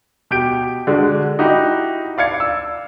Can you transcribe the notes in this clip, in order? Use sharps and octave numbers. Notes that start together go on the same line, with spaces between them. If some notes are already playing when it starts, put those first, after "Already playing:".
B2 G4 G6 D7
D3 G#3 F#4
D#4 E4 F#4 G4
D5 F5 G#6 C#7
E6